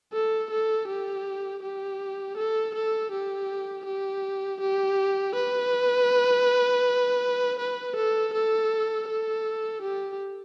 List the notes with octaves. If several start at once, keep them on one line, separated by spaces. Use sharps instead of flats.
A4
A4
G4
G4
A4
A4
G4
G4
G4
B4
B4
A4
A4
A4
G4